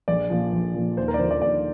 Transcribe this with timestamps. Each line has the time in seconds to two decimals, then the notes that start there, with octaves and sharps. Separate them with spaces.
0.08 A#1 D5
0.30 A#2 F3
0.52 A#1
0.74 A#2 F3
0.97 D#2 C5
1.08 A#4
1.14 D5
1.19 D3 F3 C5
1.31 D5
1.42 D#2 D5